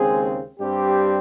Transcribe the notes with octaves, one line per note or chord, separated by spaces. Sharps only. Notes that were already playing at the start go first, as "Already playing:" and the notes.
Already playing: D#2 C#3 G#3 C4 G#4
G2 G3 C4 G4